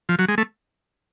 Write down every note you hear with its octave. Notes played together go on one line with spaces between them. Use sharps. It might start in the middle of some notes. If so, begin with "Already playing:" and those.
F3
F#3
G#3
A3